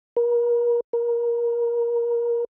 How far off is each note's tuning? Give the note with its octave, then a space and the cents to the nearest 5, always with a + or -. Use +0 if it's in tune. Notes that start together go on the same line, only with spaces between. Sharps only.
A#4 +35
A#4 +20